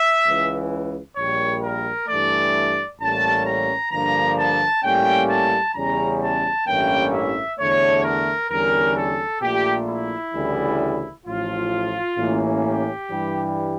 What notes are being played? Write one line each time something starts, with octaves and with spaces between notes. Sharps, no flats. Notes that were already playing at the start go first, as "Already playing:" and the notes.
Already playing: E5
C#2 C#3 E3
A#1 A#2 G3 C#5
A#4
G2 E3 A3 D5
A1 A2 G3 A#3 C#4 A5
A#5
G2 D3 F3 A#3 D4 A#5
A5
A2 G3 A#3 C#4 G5
A5
E2 C#3 G3 C#4 A#5
A5
A1 G2 E3 A#3 C#4 G5
E5
E2 D3 A3 C#5
A#4
E2 D3 G3 C#4 A#4
A4
A#1 A#2 A3 G4
E4
D2 C#3 E3 G3
A1 A2 F3 F4
A1 A2 E3 A#3 C#4
G4
G2 E3 G3